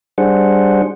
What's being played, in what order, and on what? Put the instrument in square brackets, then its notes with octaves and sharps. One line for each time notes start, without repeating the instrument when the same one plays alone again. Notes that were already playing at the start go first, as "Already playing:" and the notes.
[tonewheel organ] G3 D4 G#4 C5 F#5